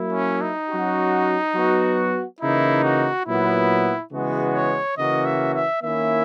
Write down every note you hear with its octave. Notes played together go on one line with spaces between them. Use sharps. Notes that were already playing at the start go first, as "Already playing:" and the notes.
Already playing: F#3 A#3 E4
C#4
D#4
F#3 C#4 F#4
F#3 B3 F#4
C#3 E3 A#3 D#4 E4
F#4
A#2 F#3 B3 E4
C#3 E3 G#3 B3 F#4
C#5
C#3 E3 A#3 C#4 F#4 D#5
E5
E5
D#3 A#3 C#4 E4 E5